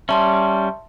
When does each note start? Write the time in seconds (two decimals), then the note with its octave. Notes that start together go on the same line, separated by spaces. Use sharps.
0.09 G3 C#4 E5 A5 C6